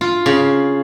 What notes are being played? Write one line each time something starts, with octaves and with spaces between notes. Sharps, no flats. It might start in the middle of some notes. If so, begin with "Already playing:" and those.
F4
C#3